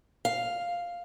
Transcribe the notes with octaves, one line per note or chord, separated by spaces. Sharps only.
F5